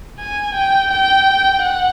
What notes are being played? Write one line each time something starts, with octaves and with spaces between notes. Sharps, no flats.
G#5
G5
G5
F#5